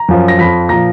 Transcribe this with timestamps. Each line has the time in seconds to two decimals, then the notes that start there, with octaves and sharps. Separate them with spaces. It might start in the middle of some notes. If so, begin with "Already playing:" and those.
Already playing: A#5
0.08 F#2 F3
0.28 A#6
0.38 F2 F3 B5 B6
0.69 A#2 F3 A#5 A#6